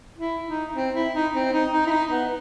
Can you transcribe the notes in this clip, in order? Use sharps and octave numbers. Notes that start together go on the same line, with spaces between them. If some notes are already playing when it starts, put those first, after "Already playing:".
E4
D#4
C4
E4
D#4
C4
D#4
D#4
E4
D#4
B3